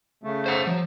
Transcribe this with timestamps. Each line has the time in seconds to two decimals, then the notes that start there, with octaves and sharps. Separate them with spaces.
0.23 C#3 A3
0.46 C5 F#5
0.67 F3 F#3